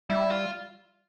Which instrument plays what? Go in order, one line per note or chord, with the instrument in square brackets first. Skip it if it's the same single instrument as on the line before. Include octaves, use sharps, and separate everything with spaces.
[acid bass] G3 [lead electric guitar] E4
[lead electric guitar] F4